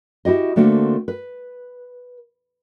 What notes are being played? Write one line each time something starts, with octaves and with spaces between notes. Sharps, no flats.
E4 F#4 G4 D#5
D3 A3 A#3 C4 F#4
B4